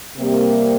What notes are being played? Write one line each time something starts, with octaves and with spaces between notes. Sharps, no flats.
C3 G3 A#3